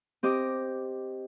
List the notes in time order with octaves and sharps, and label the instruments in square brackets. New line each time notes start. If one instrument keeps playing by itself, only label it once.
[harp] C4 G4 D#5 D6